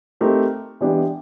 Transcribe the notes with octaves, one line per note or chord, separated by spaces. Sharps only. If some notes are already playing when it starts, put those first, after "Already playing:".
A3 C4 D#4 G4 A#4
E3 G#3 B3 D4 G4